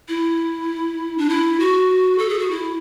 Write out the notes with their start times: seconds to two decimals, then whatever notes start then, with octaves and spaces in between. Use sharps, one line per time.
0.08 E4
1.18 D4
1.29 E4
1.60 F#4
2.18 A4
2.29 G#4
2.39 F#4
2.51 E4